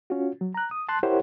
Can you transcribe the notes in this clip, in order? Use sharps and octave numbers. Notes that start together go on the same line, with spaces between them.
C#4 F4 F#4
F#3
A#5 F#6
D#6
A5 C6 F#6
E4 G4 A#4 C5 C#5 F#5